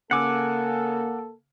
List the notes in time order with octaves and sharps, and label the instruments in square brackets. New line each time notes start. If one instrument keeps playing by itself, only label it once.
[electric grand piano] C#3 G#5 E6 [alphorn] A#3 [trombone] A4 [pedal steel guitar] F#5 D6